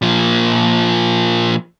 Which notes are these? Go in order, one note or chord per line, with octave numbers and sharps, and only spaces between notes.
A#2 F3